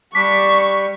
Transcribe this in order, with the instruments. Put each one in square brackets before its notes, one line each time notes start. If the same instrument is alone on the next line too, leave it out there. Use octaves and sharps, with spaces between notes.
[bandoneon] G3 [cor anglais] D4 [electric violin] C#6 [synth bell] B6